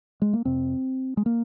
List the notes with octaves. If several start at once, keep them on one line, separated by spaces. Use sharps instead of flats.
G#3
A#3
F2 C3 C4
G#3
A#3